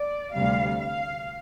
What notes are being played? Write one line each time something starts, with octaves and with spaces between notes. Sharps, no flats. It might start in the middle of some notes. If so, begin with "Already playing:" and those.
Already playing: D5
D2 C3 G3 F5
F5